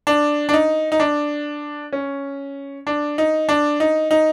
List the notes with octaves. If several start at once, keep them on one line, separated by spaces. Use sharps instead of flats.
D4
D4
D#4
D#4
D4
C#4
D4
D#4
D4
D#4
D#4